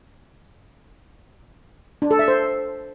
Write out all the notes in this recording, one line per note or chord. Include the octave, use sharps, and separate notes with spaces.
D4
A4
E5
C5